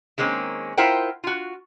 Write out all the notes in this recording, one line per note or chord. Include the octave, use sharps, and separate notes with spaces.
D#3 G#3 A#3 C4 C#4
E4 F4 A#4 C5 F#5 G5
F4 F#4